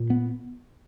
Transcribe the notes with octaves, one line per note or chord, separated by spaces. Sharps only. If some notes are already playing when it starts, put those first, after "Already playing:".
Already playing: A#2
B3